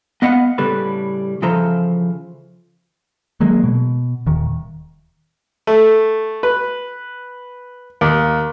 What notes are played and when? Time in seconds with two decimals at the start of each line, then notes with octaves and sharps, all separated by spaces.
0.22 B3 D#5 F5 F#5
0.58 A2 C#3 G3 A4 B4
1.42 C#3 E3 F3 A4 C5 A#5
3.40 D#3 F#3 G#3 A#3
3.64 B2
4.27 D#1 D#3
5.67 A3
6.43 B4
8.01 D#2